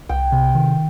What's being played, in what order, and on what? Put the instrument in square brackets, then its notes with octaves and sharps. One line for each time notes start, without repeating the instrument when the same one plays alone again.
[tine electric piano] C2 [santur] G5
[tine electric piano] C3
D#3